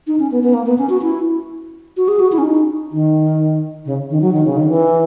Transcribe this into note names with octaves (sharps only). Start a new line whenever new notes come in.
D#4
C#4
B3
B3
A#3
B3
C#4
F#4
E4
F#4
G#4
F#4
E4
C#4
D#4
D#3
C#3
D#3
F#3
D#3
C#3
D#3
E3